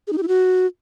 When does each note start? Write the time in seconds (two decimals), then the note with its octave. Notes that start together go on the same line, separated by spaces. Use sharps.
0.07 G#4
0.12 D#4
0.18 G4
0.23 E4
0.28 F#4